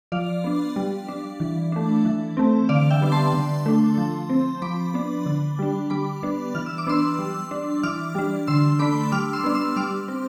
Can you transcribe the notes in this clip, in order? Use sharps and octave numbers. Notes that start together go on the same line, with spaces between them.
F3 D5 F5
B3 D4
G3
D4
E3
A3 D4
E3
A3 C4
D3 D5 F5
E5 G5
G3 B3 D4
A5 C6
D3
A3 D4
F3
C4
F3 B5 D6
B3 D4
D3
G3 D4
G3 B5 D6
B3 D4
E3 F6
E6
D6
B3 D4 C6 E6
G3
D4
E3 D6 F6
G3 D4
D3 C6 E6
A3 D4 B5 D6
G3 D6 F6
C6 E6
B3 D4
C6 E6
G3 D6 F6
C4